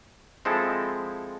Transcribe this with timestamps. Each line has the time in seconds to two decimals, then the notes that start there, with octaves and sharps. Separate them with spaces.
0.45 F3 G#3 C4 E4 A4